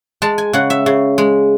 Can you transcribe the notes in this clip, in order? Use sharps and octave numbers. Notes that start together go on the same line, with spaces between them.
G#3 A5
G#5
C#3 F#5
E5
C#3
G#3